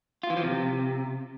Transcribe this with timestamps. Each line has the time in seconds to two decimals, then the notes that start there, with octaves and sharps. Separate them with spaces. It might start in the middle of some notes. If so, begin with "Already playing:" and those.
0.23 F4
0.30 E3
0.37 F3
0.43 C3